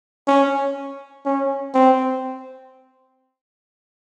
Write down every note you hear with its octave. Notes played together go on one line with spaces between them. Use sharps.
C#4
C#4
C4